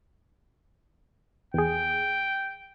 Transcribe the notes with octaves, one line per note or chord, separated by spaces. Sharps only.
E2 G#4 G5